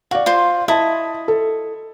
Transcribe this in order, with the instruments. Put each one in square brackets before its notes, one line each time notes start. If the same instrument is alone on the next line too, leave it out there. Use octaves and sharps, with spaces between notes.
[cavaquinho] F#4 [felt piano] D5 F5
[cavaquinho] F4 C5 C6
[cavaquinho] E4 D#5 [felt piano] A5
[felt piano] A4